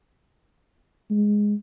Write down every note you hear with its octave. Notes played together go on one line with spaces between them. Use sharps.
G#3